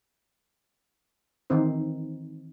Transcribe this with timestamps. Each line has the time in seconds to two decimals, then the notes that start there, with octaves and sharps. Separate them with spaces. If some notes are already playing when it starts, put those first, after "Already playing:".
1.50 D#3 E3 C4 D#4 C5